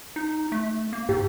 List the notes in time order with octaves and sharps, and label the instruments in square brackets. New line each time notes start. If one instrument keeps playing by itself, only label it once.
[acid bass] D#4
A3
A#3
[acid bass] G#2 [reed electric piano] G4